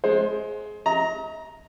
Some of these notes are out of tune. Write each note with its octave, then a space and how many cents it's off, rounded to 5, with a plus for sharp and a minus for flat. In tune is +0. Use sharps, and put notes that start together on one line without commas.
G#3 +20 C5 +25
D#5 +40 A#5 +0